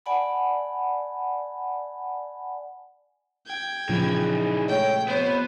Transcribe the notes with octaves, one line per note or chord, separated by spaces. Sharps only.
D5 F#5 G#5 A5 B5
G5 G#6
F#2 A#2 C#3 E3 F3 D#4 E4 G#4
G#3 A3 C#5 G5
F2 C3 B3 C5 C#5